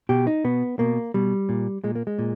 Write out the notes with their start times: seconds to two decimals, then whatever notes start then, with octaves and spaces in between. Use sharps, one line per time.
0.09 B2 G4
0.27 D#4
0.44 B2 B3
0.79 B2 A#3
1.14 B2 G3
1.49 A#2
1.84 A#2 G#3
1.95 A#3
2.07 G#3
2.19 A#2